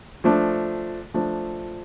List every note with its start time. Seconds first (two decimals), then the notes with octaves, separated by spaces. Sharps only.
0.24 F3 A3 D4
1.14 F3 A3 D4